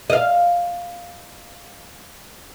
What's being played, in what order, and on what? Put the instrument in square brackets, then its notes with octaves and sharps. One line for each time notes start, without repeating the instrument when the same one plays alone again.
[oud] D#5 F5